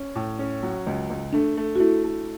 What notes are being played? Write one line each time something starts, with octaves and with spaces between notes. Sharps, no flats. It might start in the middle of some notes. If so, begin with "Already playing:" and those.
Already playing: C#4
A2
C#4
F#3
C#2
C#2
A3 D4
A3
F#4
A3 E4
A3